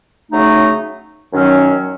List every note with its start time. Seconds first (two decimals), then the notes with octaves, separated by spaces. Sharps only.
0.30 C#3 F#3 A3 D#4
1.33 F#2 D#3 F#3 C#4